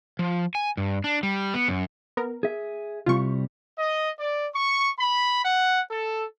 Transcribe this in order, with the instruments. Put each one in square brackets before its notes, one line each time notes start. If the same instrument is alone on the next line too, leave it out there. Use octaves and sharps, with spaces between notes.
[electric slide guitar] F3
G#5
G2
D4
G3
B3
F#2
[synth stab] B3 A#4
[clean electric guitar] G#4 E5
[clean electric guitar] C2 C3 G3 [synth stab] F4 C#6
[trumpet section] D#5
D5
C#6
B5
F#5
A4